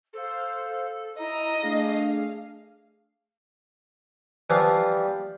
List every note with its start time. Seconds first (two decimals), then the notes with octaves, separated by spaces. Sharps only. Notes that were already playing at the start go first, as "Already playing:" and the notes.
0.13 A4 C5 F5
1.19 E4 D#5 A#5
1.62 A3 D4 G#4 F5
4.50 E3 F3 G3 F5